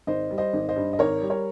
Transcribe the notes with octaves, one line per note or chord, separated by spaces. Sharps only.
G#1 C5 D#5
G3
C5 D#5
G#1
C5 D#5
G2
D#5
G#1 A#4 C#5
G3
A#4 C#5